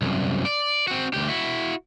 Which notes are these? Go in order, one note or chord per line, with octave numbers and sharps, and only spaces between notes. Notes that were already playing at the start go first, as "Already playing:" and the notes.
C2 F#2
D5
C4 F#4
D2 G4
E4 F#4